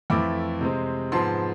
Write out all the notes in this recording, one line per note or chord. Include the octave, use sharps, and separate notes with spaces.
F2 E3 A3 E4 B5 D6
C3 G#3 C4
G#2 F3 B3 A5 C6